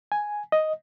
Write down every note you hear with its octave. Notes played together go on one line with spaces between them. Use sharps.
G#5
D#5